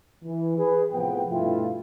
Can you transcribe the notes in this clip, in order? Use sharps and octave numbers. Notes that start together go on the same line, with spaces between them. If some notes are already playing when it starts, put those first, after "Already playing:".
E3
G#4 B4
A2 C3 F3 B3 G5
G2 B2 A3 E4 F4